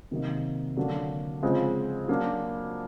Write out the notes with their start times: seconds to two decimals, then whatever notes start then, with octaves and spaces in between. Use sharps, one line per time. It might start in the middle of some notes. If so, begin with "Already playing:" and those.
0.11 C3 D#3 F#3 A#3 D#4
0.76 D3 F#3 A#3 D4 F#4
1.42 C#3 F3 G#3 C4
2.08 F#3 A#3 D4